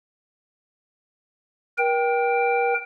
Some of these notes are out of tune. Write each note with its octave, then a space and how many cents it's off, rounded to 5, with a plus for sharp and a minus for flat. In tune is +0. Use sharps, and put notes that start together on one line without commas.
A#4 +40 G5 +0